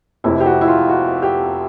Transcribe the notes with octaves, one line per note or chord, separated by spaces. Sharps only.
F1 F2 C3 E4
G4
F#4
E4
F4
F#4
G4